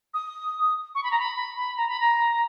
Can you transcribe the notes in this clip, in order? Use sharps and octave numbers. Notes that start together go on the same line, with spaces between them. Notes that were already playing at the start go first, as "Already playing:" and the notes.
D#6
C#6
B5
A#5
B5
B5
B5
A#5
B5
A#5